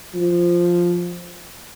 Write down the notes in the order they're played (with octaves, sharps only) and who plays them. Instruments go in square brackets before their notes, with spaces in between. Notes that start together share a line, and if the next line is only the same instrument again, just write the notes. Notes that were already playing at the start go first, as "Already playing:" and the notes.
[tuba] F3